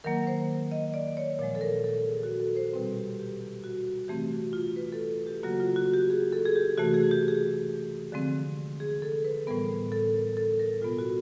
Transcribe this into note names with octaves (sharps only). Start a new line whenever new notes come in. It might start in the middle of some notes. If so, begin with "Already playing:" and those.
D#3 F#3 A#3 A#4
C5
D#5
D5
C#5
A#2 F3 G#3
A4
A#4
A4
G#4
F#4
A4
C5
B2 G3 C4 B4
G4
G4
G4
F#4
C3 E3 A3 C4 G4
F#4
F4
B4
A4
G4
C#3 F#3 A#3 F#4
F4
F#4
G4
G#4
A4
G#4
G4
C3 E3 A3 F#4
G#4
G4
G#4
D3 F3 G#3 C4
G#4
A4
B4
A2 E3 G3 B3 A#4
A4
A#4
A4
A#4
B2 G#3 B3 F4
F#4